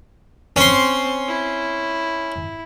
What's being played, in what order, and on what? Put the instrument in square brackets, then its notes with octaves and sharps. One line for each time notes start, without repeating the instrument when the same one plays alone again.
[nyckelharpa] C4 [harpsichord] C#4 C6
[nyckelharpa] E4